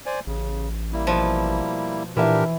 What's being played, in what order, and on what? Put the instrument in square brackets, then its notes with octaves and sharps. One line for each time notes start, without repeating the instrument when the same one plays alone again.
[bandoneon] C5 D5 G#5
[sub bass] A1 [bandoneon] C#3
[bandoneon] G3 A#3 E4
[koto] B2 F3
[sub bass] A#2 [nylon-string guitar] E3 E5 [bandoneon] D4 G4 A#4